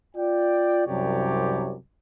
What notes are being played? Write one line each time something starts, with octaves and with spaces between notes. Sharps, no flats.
F4 D5 G5
C2 F#2 C3 G4 C#5 D5